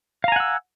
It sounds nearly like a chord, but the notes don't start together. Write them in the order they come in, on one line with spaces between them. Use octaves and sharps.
F5 A#5 G#5 F#5 E6